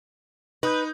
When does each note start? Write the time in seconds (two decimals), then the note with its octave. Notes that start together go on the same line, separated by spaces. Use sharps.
0.63 D#4 B4 D#6 G6